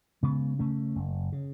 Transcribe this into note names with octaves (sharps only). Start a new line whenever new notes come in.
C#3 G#3 B3
C#3 A3 C#4
F#1
C#3